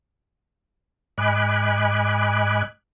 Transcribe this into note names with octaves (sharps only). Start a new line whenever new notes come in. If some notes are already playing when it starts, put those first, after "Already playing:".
G#2 D#5 G#5 B5 D6 F#6